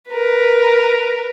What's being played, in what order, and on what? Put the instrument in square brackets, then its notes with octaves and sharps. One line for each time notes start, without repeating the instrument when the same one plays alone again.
[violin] A#4 B4